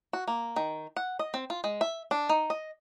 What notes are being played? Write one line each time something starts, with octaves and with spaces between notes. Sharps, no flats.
F#4
A#3
D#3
F#5
D#5
C4
F4
G#3
E5
D4
D#4
D#5